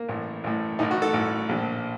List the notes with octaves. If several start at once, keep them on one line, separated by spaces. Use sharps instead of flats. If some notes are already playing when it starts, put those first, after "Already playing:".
Already playing: A#3
A1 A2
A1 A2
A1 A2 D#4
F#4
A4
A1 A2
A#1 A#2